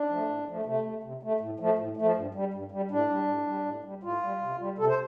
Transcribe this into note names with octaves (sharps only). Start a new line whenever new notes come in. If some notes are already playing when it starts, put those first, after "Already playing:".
Already playing: D4
F3 A3
A2
F3 A3
C3 A3
A3
C3
A3
A2
F3 A3
A2
A3
F3
G2
G3
G2
G3
A2 D4
G3
A2
G3
A2
G3
A2 F4
G3
C3
G3
C3 A4
C5